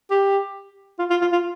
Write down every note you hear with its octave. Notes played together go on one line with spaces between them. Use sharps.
G4
F4
F4
F4
F4